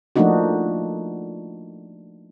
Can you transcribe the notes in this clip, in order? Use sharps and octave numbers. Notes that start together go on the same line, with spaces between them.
F3 A3 A#3 D4 D#4 F#4